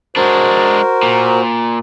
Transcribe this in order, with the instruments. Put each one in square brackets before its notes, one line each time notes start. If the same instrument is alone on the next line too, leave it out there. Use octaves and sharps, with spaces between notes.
[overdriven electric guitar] G#3 D4 [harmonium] F#4 C5 [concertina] A#4
[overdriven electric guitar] A#2